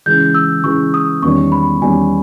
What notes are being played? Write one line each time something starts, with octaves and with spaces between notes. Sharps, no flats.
C#3 E3 G#3 G6
E6
C#3 E3 G#3 C#6
D#6
E2 D#3 G3 C#4 C#6
B5
E2 D#3 G3 C#4 G#5